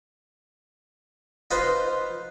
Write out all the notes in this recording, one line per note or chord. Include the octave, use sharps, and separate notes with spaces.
D#4 F4 B4 C5